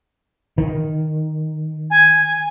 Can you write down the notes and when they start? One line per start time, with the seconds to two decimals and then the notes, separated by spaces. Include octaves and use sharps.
0.58 D#3
1.90 G#5